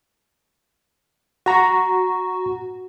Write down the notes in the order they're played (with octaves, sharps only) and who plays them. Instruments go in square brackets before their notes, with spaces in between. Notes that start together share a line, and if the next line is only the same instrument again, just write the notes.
[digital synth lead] F#4 [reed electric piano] F#5 A#5 C#6